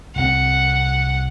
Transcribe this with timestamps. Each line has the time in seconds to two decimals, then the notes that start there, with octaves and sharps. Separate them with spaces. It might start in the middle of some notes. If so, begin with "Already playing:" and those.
0.16 C2 C4 F#5